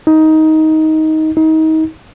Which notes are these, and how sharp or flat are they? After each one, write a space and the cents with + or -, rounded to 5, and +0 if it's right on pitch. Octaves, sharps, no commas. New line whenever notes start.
D#4 +15
D#4 +30